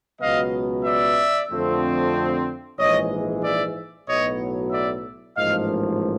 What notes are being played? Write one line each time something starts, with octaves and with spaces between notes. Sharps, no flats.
C#2 B2 F#3 B3 D#5 F5
D5 E5
F2 D3 F3 A3 C4
A#1 G#2 E3 G#3 C#5 D#5
D5 E5
B1 A2 F#3 B3 C#5 D#5
D5 E5
A1 G#2 F3 A#3 D#5 F5